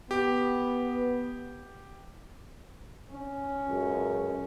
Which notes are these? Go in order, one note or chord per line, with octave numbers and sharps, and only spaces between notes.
B3 G4
C#4
C#2 F#2